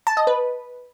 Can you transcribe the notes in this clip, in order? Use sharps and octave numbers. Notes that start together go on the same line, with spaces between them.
A5
D#5
B4